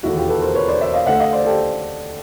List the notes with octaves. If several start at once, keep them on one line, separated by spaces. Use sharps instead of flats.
E1 D#2 D3 E4 F#4
F4 G4
A4 B4
A#4 C5
B4 C#5
C5 D5
D5 E5
D#5 F5
D2 D3 E5 F#5
D#5 F5
C5 D5
G4 A4